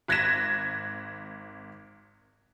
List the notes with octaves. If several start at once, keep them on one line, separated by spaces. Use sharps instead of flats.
G#1 F#6 G#6 A#6 B6 E7